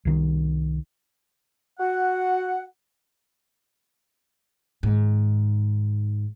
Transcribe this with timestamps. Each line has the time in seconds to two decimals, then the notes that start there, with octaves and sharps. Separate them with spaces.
0.05 C2 D#3
1.80 F#4 F#5
4.83 G#2 D#3